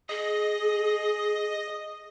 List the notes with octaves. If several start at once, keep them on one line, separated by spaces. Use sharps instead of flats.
G#4 D#5